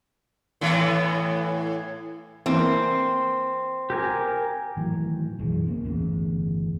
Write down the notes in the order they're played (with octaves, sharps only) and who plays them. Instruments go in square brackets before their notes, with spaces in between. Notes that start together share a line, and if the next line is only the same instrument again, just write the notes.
[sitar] A2 E3 B3
[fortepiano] E3 A#3 [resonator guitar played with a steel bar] C4
[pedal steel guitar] G4 A#4 G#5
[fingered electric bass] A2 D#3 E3 F#3
B1 F#2 E3 G#3
C#2 C#3 A#3 C4
G1 E2 A2 C#3